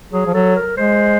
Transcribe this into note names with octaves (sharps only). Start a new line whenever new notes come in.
F#3 G#4
F3
F#3 A4
A#4
G#3 C5